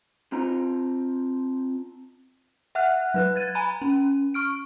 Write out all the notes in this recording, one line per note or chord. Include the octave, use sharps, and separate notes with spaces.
C4 F4 A#5
E5 F#5 F6 F#6
F#3 B4 F#6
G#6 A6 D#7
G#5 A#5 B5 D#7
C#4
C#6 F6 D7